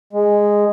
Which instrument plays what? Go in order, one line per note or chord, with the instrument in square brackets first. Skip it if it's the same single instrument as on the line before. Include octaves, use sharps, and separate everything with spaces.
[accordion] G#3